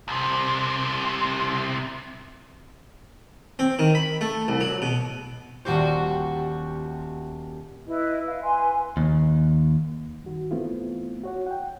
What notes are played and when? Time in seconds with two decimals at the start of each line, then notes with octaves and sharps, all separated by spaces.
0.08 C2 C3
3.59 C4
3.79 D#3
3.95 B5
4.21 A3
4.48 C2
4.60 F#3
4.82 B2
5.65 D#1 A#2 F#4 G4 C5
7.87 E4 B4 D#5
8.26 F5
8.42 B4 G#5 C6
8.97 D#2
10.23 G2 D#3 F#4
10.51 E3 A3 B3 C4 E4 F4
11.24 F#4 C#5 F#5
11.47 F#5 G5